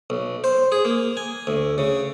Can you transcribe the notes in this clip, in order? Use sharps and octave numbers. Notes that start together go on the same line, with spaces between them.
B1
C5
G#4
A#3
G#5
D2
C#3